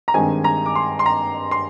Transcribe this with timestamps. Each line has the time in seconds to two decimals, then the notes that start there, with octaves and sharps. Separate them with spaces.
0.08 A#5
0.14 G2 D#3 G#3 C4 G#5
0.44 A#5
0.66 D6
0.75 C6
0.99 C6
1.06 A#5
1.51 C6